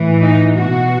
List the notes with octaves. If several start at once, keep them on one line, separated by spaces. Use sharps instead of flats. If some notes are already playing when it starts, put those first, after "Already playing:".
Already playing: A2 E3
D#4
B2 F#4